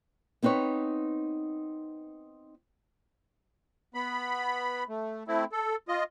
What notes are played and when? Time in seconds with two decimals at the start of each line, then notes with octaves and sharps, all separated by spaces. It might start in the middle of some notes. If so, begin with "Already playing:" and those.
0.43 B3 C4 D#4 B4 C#5
3.94 B3 B5
4.89 A3
5.28 A3 C4 E4
5.52 A4
5.88 F4 D#5